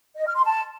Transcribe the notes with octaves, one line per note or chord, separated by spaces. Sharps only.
D#5
F6
C6
A5